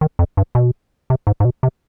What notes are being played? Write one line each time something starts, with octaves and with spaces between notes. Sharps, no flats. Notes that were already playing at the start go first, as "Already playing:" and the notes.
D#3
F2
G2
B2
C3
G#2
G#2
B2
C3